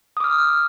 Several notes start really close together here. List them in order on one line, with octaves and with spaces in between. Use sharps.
D#6 D6 F6